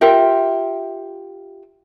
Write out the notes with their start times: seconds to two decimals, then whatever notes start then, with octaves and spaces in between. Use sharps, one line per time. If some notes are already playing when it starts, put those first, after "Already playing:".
0.01 F4 G4 A#4 E5